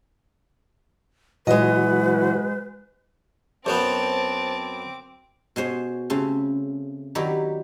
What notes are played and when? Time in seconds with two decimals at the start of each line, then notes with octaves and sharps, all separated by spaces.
1.47 A#2 E3 F#3 G#3 F#4 B4 D#5
3.66 F#2 F#3 B3 C4 C5 A5 D6
5.56 B2 G#4 C5 C#5
6.10 C#3 A3 C4
7.15 D#3 F#3 E4 G4 D5 A#5